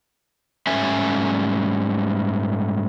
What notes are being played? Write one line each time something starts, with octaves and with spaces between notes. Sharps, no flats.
G#2 G3 A3 C#4 E5 G#5